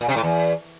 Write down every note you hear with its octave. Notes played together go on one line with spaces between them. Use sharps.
A#2
C3
A2
E2